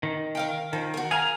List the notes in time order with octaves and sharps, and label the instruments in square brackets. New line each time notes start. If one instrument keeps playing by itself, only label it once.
[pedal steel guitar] D#3
[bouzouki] A#4 F5 G5
[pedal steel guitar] D#3 [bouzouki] F3
[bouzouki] F#4 A#4
[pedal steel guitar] G#4 F5 A#5 [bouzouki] G#5